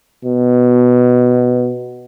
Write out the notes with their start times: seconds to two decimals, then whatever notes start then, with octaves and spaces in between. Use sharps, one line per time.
0.25 B2